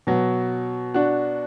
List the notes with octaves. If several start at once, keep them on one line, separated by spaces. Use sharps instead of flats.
B2 F#3
D4 F#4